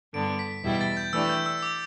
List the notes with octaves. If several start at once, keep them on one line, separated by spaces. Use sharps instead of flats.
G2 D3 B3 D4 D7
B6
E2 B2 G3 E4 G4 B6
B6
A6
G6
E3 A3 D4 G4 E6
G6
E6
D6